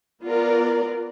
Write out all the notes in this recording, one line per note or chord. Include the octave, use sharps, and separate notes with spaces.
B3 F4 A#4 D5